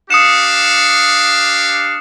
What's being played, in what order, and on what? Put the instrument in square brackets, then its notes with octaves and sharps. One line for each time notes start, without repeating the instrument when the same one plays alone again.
[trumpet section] D4 G4 F5 [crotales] D#6 C#7 E7